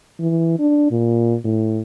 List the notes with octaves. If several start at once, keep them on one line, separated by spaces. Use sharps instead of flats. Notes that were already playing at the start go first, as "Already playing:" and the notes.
E3
D4
A#2
A2